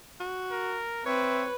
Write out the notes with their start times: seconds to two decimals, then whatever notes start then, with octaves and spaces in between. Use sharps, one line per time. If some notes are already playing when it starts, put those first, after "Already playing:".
0.20 F#4
0.51 A#4
1.06 C4 B4 C#5 E5